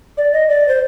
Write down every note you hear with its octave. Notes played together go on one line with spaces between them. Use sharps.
D5
D#5
D5
C5